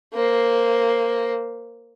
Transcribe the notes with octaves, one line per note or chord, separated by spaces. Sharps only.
A#3 C5